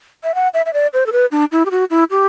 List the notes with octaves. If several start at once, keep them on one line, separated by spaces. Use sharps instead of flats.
E5
F#5
E5
E5
D5
C5
A4
B4
D4
E4
G4
F#4
E4
G4